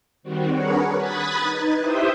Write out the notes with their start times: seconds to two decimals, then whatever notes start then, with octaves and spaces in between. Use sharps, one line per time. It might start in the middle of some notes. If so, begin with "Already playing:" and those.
0.23 D#3 G3 C4 F#4
0.53 D4 G#4 A#4 B4 C#5 F#5
0.95 B5 D#6 F#6 G#6 A6 B6
1.40 D#4 B4
1.78 E4 G4 C5 E5 D#6 G6